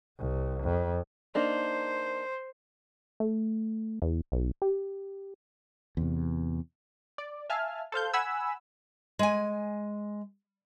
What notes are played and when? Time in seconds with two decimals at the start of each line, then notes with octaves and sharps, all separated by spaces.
0.19 C2
0.63 F2
1.35 A#3 D4 D#4 C5
3.20 A3
4.02 E2
4.32 B1
4.62 G4
5.97 E2 C3
7.18 D5
7.50 E5 F5 G#5 A5 F6
7.92 A4 C5 F5 G6
8.14 F#5 G#5 B5 E6
9.19 G#3 G#5